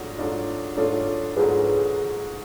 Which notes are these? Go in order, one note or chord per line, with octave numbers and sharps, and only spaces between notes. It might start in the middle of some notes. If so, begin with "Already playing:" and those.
Already playing: G#2 F#3 A3 D4 F4
G#2 F#3 A3 D4 F4
G#2 F#3 A3 D4 F4 A4 C#5
G#2 F#3 A3 D4 F4 G#4 B4